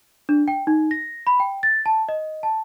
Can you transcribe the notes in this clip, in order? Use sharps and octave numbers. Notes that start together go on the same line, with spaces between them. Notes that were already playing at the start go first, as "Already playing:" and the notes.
D4
G5
D#4
A#6
B5
G5
A6
A5
D#5
A5